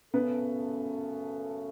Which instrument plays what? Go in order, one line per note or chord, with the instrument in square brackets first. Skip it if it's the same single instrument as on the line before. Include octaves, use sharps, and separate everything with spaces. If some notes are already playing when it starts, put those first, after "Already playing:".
[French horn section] F#2 C#3 A3 C#4 A4 [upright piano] B3